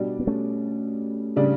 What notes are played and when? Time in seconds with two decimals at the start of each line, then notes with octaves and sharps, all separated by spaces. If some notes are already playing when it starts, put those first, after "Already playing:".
Already playing: B2 G3 D4 G4
0.19 B3
0.27 A3 C#4
1.36 C#3 G3 D4